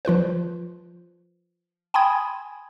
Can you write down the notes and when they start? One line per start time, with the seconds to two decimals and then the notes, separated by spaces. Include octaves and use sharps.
0.05 F3 F4 B4 C5
1.94 G5 G#5 B5 C6 D#6 G#6